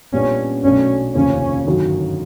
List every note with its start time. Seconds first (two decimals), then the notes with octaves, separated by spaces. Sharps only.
0.13 A#2 G3 B3 C#4 D4
0.64 B1 B2 F#3 A3 C#4 D4
1.14 F1 D#2 C#3 F3 A#3 C#4
1.66 G1 F#2 D#3 F#3